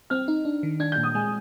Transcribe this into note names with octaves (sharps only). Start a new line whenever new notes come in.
C4 F6
D#4
D4
D#3
D4 G#6
G6
A#2
D#6
G#3 G#5